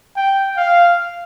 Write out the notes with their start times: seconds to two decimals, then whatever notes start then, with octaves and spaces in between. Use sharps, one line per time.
0.16 G5
0.57 F5